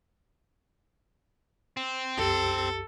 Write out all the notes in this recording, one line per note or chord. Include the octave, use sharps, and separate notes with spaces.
C4
C2 F#2 G4 A4